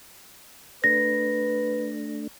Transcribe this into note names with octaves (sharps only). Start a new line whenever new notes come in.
A3 D4 B4 A#6